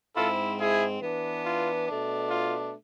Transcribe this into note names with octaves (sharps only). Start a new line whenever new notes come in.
G#2 G#3 C4 E4 F4 A4
E4 G#4
E3 B3 D4
F4
B2 A3 D4
F4